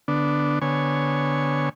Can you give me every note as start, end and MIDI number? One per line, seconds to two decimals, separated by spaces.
0.08 0.59 50
0.08 0.59 59
0.08 0.59 62
0.61 1.69 50
0.61 1.69 59
0.61 1.69 73
0.61 1.69 80